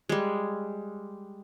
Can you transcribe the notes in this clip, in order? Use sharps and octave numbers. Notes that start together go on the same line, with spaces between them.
G3 G#3